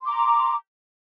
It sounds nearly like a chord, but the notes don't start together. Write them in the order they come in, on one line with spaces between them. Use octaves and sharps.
C6 D6 A#5